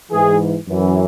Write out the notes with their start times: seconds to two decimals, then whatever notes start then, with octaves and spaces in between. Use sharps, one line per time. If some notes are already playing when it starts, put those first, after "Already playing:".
0.12 G#2 E3 G#4
0.68 F#2 E3